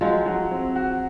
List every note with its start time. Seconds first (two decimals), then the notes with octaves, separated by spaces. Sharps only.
0.01 F3 F#3 G#3
0.26 F#3
0.51 C4
0.76 F#4